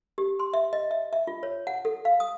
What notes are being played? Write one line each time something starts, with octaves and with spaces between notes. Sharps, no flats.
G4
C6
E5
D#5
E5
E5
F4
C#5
F#5
A4
F5
D#6